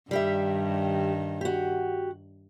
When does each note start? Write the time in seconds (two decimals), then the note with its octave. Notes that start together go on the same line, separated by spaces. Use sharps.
0.11 G2 D#3 G3 G4 E5
1.41 F#4 G4